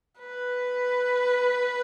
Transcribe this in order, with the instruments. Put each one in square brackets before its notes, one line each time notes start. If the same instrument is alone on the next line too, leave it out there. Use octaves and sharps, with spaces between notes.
[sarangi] B4